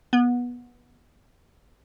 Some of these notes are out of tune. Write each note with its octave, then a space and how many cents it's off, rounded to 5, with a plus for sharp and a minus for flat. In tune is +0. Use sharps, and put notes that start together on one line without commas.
B3 -20